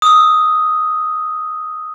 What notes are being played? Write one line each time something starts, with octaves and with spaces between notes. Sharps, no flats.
D#6 E6